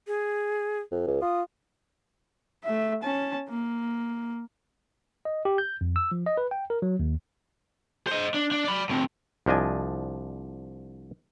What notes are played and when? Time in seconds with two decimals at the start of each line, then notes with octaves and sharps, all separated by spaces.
0.07 G#4
0.92 F2
1.07 C#2
1.22 F4 D#6
2.64 A3 E5
3.03 C#4 A5
3.49 A#3
5.25 D#5
5.45 G4
5.58 G6
5.81 F2
5.96 E6
6.12 F3
6.26 D#5
6.37 B4
6.51 G5
6.70 A#4
6.82 F#3
6.99 D#2
8.07 C5 D#5
8.34 D4
8.51 D4
8.65 D5 B5
8.89 A2 C4
9.46 C2 F3 D4 D#5 G#5